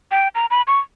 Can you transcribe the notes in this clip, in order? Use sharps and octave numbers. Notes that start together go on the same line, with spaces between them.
G5
A#5
B5
C#6